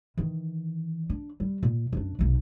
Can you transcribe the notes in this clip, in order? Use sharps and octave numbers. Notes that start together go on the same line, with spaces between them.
D#3 E3
D4
G3
A#2
F#2 D4
F1 B1